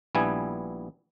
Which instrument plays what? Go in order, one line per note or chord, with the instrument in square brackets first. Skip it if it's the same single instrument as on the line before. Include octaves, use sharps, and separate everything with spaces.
[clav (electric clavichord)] A#1 G3 B3 E4 G#5